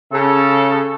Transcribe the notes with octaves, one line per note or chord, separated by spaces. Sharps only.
C#3 A4